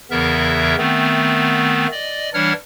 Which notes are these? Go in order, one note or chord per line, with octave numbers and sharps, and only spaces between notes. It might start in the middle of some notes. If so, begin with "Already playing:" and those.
E2 C#3 E3 B3 A#4 E5
D#3 A3 B3 C4
D5 D#5
E3 G3 D4 C#5 F#5 F6